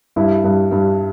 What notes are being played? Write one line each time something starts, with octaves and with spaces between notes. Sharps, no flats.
G2 E4
G2
G2